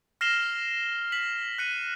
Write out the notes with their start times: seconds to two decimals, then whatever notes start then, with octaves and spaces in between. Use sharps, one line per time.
0.21 F6 A#6 C7 E7 F7 G7
1.12 B6 F#7
1.58 F#6 C#7 D#7